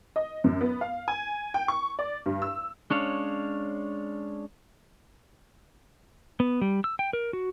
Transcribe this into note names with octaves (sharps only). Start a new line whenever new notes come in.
D#5
F#2
B3
F5
G#5
G5
C#6
D5
G2
E6
G#3 C#4 D4 C#5 F5
B3
G3
E6
G5
A#4
F#4